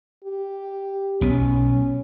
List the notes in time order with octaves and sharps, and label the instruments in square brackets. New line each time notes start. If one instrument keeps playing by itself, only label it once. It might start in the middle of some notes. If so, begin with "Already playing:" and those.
[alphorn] G4
[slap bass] B1 B3 [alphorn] C#4